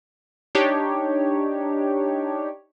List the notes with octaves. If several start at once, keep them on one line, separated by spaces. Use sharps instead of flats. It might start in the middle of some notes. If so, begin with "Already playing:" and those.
D4 D#4 G4 C#5